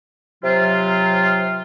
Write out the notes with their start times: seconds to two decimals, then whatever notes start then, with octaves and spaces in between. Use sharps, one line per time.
0.44 C3 F#3 F4